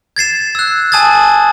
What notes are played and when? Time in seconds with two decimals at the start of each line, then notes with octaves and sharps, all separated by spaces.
0.16 G#6 A6 C7 E7
0.55 E6 F#6
0.92 G#5 A5 D#6 G#6 A6